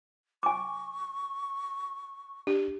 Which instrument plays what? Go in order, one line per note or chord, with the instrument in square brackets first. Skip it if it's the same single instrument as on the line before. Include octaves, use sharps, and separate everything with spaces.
[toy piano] G#5 D6 [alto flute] C#6
[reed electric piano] D4 [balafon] G4